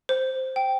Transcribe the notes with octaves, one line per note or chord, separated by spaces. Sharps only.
C5
G5